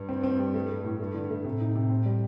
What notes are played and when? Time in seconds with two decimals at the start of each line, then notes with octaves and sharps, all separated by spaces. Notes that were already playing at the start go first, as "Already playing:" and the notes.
Already playing: G2
0.09 C4
0.23 C4
0.39 G3
0.54 A3
0.70 A3
0.84 A2
1.00 G2 A3
1.14 D3
1.30 A3
1.45 A2 C3
1.60 D#4
1.75 C3
1.90 C4
2.05 G3